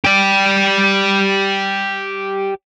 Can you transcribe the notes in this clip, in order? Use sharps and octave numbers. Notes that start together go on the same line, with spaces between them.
G4 D5